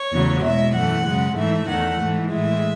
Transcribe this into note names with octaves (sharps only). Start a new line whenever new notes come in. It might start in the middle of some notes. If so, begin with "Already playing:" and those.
Already playing: C#5
E2 C#3 F#3 A3
B2 G#3 E5
F#2 E3 A3 F#5
F#2 C#3 G#3
G#2 E3 A3 E5
E2 D#3 A3 F#5
G#2 E3 A3
A2 E3 G#3 E5